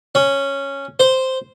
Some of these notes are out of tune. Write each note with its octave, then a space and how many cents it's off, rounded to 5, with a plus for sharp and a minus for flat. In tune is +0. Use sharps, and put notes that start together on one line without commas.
C#4 -5
C5 -5